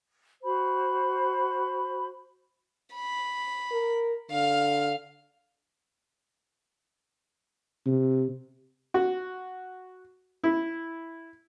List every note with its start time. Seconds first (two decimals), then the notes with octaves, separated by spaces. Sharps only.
0.43 F#4 C5 B5
2.94 B5
3.72 A#4
4.31 D3 F5 F6
7.86 C3
8.94 F#4
10.44 E4